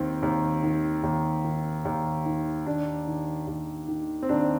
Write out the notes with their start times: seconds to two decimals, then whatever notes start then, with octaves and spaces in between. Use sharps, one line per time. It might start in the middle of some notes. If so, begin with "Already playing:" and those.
Already playing: D#2 D#3 C4
0.23 D#2
0.63 D#3
1.03 D#2
1.44 D#3
1.85 D#2
2.26 D#3
2.66 D#2 D4
3.07 D#3
3.47 D#2
3.88 D#3
4.23 C4
4.29 D#2 D4